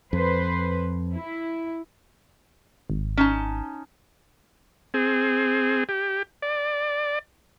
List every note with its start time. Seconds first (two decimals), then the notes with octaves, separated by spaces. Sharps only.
0.13 F2 B4 C5
1.15 E4
2.90 G#1
3.17 C#4 D#4 A5
4.94 C4 G#4
5.89 G4
6.42 D5